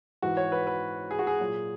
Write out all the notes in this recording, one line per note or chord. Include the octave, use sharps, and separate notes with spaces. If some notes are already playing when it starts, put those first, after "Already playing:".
G#2 E3 F#4
C#5
B4
B4
G#4
F#4
G#4
A#2 F#3